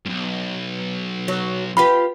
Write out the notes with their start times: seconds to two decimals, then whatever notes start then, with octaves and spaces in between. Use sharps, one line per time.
0.05 B1 G2
1.28 F#3
1.77 F4 G4 B4 B5